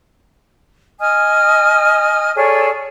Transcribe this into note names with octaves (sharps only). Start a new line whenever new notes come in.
D#5 G#5 D#6 F6
G#4 A4 C#5 D5